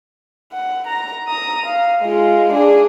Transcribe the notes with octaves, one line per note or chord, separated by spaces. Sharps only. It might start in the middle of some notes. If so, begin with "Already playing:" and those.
F#5
A#5
A#5 D#6
F5
G#3 F4
D4 G#4